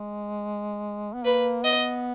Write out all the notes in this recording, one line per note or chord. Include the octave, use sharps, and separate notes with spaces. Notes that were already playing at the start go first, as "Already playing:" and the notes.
Already playing: G#3
B3
A#3 B4
B3 D#5